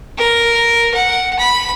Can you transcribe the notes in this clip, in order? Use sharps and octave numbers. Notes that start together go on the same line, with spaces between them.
A#4
F#5
B5